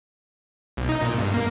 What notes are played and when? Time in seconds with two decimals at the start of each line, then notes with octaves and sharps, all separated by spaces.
0.77 B1
0.89 D#4
1.02 A#2
1.18 G2
1.34 A#3